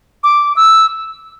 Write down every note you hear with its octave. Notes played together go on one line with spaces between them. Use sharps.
D6
E6